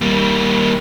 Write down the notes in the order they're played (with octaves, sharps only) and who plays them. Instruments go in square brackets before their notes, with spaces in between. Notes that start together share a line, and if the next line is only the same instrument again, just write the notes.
[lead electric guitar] G3 A#3